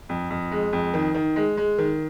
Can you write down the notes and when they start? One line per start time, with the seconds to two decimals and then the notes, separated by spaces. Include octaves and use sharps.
0.09 F2
0.30 F2
0.51 G#3
0.73 F2
0.94 D#3
1.14 D#3
1.36 G#3
1.57 G#3
1.78 D#3